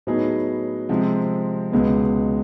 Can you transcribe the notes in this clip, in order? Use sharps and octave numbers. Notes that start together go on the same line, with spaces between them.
A2 F#3 B3 D#4 G#4
C3 F3 G#3 C4
C#2 B2 G#3 B3